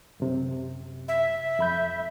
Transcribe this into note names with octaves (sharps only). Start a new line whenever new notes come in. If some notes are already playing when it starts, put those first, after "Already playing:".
F#2 C3
E5
F2 B5 G6